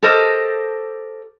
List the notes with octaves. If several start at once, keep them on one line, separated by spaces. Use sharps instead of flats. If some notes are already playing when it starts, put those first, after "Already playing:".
G4 A4 A#4 C5 D#5